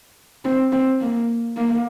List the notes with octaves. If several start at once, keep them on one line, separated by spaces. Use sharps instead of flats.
C4
C4
A#3
A#3